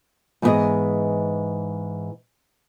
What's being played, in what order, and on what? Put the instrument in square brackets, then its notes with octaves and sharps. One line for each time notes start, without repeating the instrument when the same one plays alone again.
[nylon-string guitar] G#2 E3 B3 G4 G#4 D#5